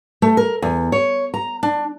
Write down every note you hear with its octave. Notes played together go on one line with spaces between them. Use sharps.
A3
A#4
E2
C#5
A#5
D4